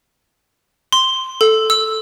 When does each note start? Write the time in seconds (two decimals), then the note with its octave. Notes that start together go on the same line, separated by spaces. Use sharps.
0.92 C6
1.41 A4
1.70 E6